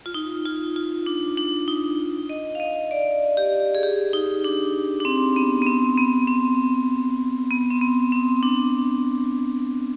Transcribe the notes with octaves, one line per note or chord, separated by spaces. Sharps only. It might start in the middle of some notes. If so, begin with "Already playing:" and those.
F4
D#4
F4
F4
D4
D4
D#4
D#5
F5
D#5
D5
G4
G#4
G4
D#4
D4
D4
C4
B3
B3
C4
B3
C4
B3
C4
B3
C4
D4